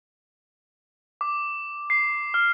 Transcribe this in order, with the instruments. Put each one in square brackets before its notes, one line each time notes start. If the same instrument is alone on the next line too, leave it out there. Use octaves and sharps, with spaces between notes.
[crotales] D6
C7
F6